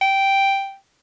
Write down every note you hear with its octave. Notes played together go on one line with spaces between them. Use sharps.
G5